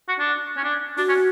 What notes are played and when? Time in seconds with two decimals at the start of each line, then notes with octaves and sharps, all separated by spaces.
0.08 F#4
0.19 D4
0.57 C#4
0.64 D4
0.97 D4 F#4
1.08 C#4